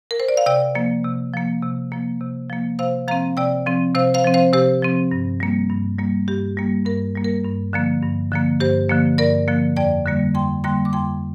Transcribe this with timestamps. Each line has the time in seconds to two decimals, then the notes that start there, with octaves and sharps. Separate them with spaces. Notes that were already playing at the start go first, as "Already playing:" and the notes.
0.11 A#4
0.20 C5
0.28 D5
0.37 F5
0.46 C3 D5 G5
0.75 F3 A#3
1.04 C3
1.33 F3 A#3
1.62 C3
1.92 F3 A#3
2.20 C3
2.50 F3 A#3
2.79 C3 C5 F5
3.08 F3 C4 F5 A#5
3.37 C3 D5 G5
3.66 F3 C4
3.95 C3 C5 F5
4.14 C5 F5
4.24 F3 C4
4.34 C5 F5
4.53 C3 G4 C5
4.82 F3 C4
5.11 G2
5.40 G3 A#3
5.70 G2
5.99 G3 A#3
6.28 G2 G4
6.57 G3 A#3
6.85 G2 A#4
7.15 G3 A#3
7.24 A#4
7.44 G2
7.73 D3 F3 A#3
8.02 G2
8.32 D3 F3 A#3
8.60 G2 G4 C5
8.89 D3 F3 A#3
9.18 G2 A#4 D5
9.48 D3 F3 A#3
9.76 F2 D5 G5
10.06 D3 G3 A#3
10.35 F2 G5 C6
10.64 D3 G3 A#3 G5 C6
10.85 D6
10.93 F2 G5 C6